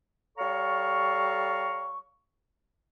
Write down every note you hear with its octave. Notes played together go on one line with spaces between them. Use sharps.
G3 A4 C#5 F5 A#5 C#6